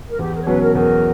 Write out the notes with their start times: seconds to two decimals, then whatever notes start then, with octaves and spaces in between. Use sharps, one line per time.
0.08 A#4
0.19 E2 G4
0.33 A#4
0.41 C#5
0.47 B2 F#3 C#4 B4
0.61 A#4
0.75 E2 A#4